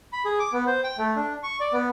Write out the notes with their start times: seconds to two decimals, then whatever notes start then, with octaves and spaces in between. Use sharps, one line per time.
0.13 B5
0.25 G#4
0.40 D6
0.53 B3
0.67 C5
0.84 G5
0.98 A3
1.16 D4
1.43 C#6
1.60 D5
1.73 B3